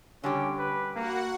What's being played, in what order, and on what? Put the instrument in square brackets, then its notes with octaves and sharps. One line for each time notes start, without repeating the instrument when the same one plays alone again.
[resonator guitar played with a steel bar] D3 G3 G4 [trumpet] C#4
[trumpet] B4
[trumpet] A#3 [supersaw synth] F#4 F#5